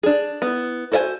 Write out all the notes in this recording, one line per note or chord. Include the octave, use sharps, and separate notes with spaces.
D4 G#4
B3 E4
F#4 A4 C5 E5 G#5